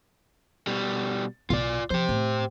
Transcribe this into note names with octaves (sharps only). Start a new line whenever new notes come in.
B2 G3
B1 B2 F4 D5
F3 G4 C5
A2